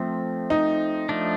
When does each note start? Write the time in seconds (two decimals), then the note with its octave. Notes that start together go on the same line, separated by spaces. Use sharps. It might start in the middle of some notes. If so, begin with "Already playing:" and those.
Already playing: F3 A3 C4
0.50 D#4
1.09 F3 A3 D4